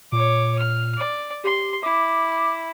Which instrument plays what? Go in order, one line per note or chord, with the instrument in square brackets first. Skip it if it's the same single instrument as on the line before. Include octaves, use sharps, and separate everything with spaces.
[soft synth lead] A#2 [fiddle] C#5 D6
[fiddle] F6
D5
[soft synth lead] G4 [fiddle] C6
[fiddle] E4 [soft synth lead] D6